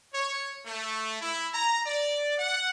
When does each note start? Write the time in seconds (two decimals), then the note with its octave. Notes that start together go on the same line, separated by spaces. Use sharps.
0.14 C#5
0.66 A3
1.21 E4
1.53 A#5
1.85 D5
2.38 F#5